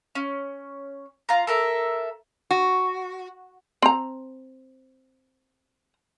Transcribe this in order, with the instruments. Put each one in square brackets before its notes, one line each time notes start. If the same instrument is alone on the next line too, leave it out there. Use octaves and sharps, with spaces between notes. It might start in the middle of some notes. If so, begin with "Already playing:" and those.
[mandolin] C#4
F4 A#5
A4 A#4 E5
[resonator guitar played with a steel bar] F#4
[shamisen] C4 A#5